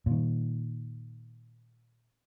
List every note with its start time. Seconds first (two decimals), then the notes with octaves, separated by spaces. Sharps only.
0.06 A#2 D#3